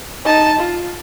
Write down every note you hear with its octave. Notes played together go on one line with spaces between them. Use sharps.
D#4 A5
F4